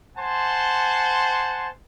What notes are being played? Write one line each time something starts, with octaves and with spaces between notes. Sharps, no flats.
C5 F#5 G#5 A5 C6